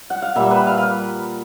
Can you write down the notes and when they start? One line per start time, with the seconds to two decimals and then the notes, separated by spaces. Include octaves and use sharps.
0.10 F#5
0.22 F5
0.36 A#2 G3 A#3 E5
0.51 B4
0.67 F5
0.78 F5